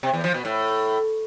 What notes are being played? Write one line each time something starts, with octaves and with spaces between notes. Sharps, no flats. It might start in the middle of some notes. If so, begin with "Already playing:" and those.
C3
E2
F3
B2
A2